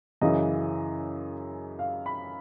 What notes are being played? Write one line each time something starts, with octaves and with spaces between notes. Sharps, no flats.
F#2 C#3 E3 D#5
F5
B5